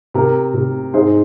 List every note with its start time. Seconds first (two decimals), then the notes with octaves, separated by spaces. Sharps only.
0.14 C3 A#4
0.54 C3
0.94 G#2 G#4 C5